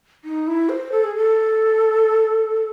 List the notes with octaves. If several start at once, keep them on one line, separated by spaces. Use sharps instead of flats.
D#4
E4
C5
A4
G#4
A4